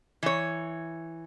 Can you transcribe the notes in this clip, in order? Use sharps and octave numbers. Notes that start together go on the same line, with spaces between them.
E3 C#5